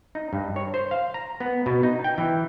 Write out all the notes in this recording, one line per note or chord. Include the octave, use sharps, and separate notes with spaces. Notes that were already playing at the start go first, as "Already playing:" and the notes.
D#4
G2
C#5
C5
F5
A#5
B3
B2
D#4
G5
E3